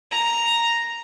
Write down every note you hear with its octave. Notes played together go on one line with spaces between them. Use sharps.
A#5